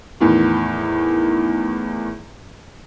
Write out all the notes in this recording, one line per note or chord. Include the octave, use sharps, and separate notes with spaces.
E2 A2 D#3